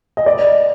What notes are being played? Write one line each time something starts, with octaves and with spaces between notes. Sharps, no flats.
D#5
D5